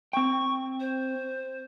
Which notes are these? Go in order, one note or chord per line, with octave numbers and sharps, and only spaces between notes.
C4 G5 C#6
C5